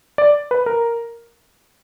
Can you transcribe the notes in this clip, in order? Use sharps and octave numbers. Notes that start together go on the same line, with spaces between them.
D5
B4
A#4